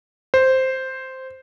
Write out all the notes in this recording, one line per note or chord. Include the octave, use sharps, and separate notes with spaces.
C5